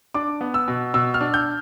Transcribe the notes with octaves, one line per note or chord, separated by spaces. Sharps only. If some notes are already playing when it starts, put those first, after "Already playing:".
D4 D6
B3
E6
B2
B2 E6
F6
D4
G6